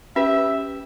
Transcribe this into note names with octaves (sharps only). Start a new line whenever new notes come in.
C#4 G4 B4 E5